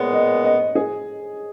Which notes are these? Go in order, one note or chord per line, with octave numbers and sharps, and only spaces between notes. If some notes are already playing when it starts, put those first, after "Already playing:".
Already playing: A#2 G#3 B3 C#5
D#5
D#5
G#4